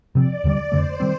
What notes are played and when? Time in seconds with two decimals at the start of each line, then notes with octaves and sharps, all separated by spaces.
0.15 C3 F3 C4 D5
0.44 D#2 D3 G3
0.72 F2 D3 A3 C5
1.00 D#3 G3 C4